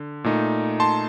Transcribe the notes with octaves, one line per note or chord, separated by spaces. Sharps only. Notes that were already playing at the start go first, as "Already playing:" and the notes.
Already playing: D3
A#2 A3 D#4
A5 C6